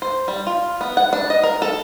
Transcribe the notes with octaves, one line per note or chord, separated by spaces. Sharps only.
C5
G3
F4
B3
F#5
D4
D#5
A#4
A4